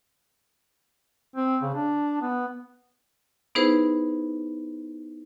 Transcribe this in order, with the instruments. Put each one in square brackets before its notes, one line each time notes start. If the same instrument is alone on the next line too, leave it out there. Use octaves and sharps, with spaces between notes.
[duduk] C4
C#3
D4
B3
[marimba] B3 D#4 E4 G#4 B4 C5